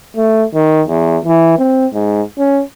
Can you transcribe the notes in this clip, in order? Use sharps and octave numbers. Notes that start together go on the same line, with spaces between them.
A3
D#3
E2
E3
C4
G#2
C#4